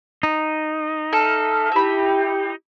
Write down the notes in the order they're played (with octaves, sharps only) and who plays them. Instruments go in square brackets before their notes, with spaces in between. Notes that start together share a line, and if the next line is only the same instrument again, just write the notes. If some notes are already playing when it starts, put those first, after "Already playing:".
[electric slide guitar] D#4
[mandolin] A4 [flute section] E5 F6
[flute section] E4 G4 [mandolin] E5 B5